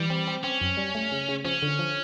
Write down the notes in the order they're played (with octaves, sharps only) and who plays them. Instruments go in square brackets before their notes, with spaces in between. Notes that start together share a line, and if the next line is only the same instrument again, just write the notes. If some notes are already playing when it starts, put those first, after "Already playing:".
Already playing: [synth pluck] E3 [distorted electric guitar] G3
[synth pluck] C4
C4
[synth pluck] C4 [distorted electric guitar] C#4
[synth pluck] F#2
G3
A3
C#3
C#3
[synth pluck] F3 [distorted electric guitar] C#4
[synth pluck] D3
F3